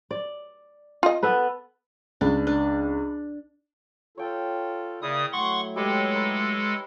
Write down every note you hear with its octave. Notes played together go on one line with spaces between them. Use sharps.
D5
F4 D#5
B3 A4 B4
C#2 D4
D4
F4 A4 C#5 G5
C#3 A#3 E4 D5 D#6
F#3 A3 F#5 C6 C#6
G#3 G4 A4 B4 C#5
D#4 B4